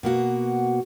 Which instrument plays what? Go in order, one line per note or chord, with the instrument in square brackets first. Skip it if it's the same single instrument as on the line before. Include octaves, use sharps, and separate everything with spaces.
[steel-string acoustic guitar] B2 A#3 F#4